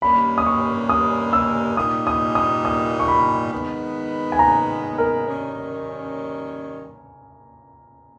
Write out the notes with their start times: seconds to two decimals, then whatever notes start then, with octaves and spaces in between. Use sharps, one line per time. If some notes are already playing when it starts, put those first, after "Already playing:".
0.02 G2 D#3 G3 A#3 C#4 B5
0.38 D#6
0.46 C#6
0.89 D#6
1.33 E6
1.77 A#2 G3 A#3 D#4 D#6
2.07 D#6
2.35 D#6
2.65 D#6
3.00 C#6
3.08 B5
3.52 D#3 G#3 B3
4.32 G#5
4.39 A#5
4.98 A#4
5.27 D#3 G3 C#4